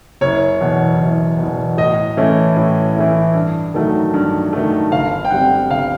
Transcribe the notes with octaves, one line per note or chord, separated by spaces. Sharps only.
F#1 C#5
E2 B2
F#1
E2 B2
A2 D#5
E3 A3 C#4 E4
A2
E3 A3 C#4 E4
G2
D#3 F#3 A3
G2
D#3 F#3 A3
G1 F5
G5
G2 D3 G3 C4 F#5
G1 F5